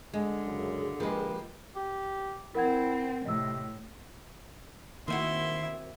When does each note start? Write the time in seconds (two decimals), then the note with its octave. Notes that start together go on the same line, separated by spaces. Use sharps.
0.14 D3 G#3 G#4
0.46 F#2 C#3
1.00 F3 G#3 A#3 G4 B4
1.76 G4
2.55 C4 E4 A#4 F#5 G#6
3.25 A2 C3 D#5 E6
5.08 D#3 A#3 C4 E4 F#4 E5 C6